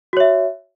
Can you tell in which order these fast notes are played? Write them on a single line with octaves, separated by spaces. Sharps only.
F#4 C#5 E5